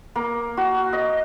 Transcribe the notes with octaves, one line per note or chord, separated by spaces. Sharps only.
A#3
F#4
D#5